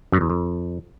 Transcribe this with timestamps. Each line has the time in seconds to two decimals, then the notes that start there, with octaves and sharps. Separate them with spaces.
0.12 F#2
0.21 E2
0.30 F2